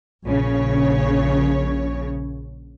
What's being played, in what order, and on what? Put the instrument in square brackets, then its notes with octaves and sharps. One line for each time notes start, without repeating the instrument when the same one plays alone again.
[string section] A#1 C#3 C#5